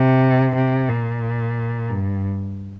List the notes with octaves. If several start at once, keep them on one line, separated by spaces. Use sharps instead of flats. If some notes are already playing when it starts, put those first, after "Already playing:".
Already playing: C3
C3
A#2
G2